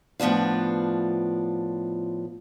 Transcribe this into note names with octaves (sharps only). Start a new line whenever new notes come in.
A2 F3 B3 D4 F4